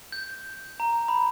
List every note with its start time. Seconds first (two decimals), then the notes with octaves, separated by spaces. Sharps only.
0.12 G6
0.80 A#5
1.08 B5